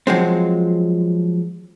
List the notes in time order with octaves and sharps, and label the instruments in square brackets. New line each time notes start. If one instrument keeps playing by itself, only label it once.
[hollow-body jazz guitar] F3 F#3 G#3 C4